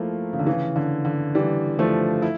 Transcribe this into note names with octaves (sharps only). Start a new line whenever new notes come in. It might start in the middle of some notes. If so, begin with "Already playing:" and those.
Already playing: F3 A3 A#3 E4
C#3
D3
C#3 E3
D3
D3
E3 G3
F3 A3
E4